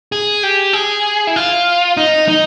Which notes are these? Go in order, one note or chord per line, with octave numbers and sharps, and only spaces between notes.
G#4
G4
G#4
E4
F4
D#4
D#4